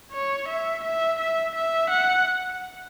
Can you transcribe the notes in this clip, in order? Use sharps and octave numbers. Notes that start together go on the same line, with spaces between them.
C#5
E5
E5
E5
E5
F#5